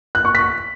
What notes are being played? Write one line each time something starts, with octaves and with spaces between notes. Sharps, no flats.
F#6
C#6
B6